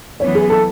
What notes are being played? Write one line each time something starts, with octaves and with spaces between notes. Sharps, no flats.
F#2 E3 B3 C#5
G#4
A4